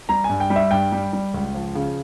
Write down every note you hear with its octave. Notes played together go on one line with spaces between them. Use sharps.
G3 A#5
G#5
G2
G5
G3
E5
G2 G5
G3
G3
C#2
F3
C#3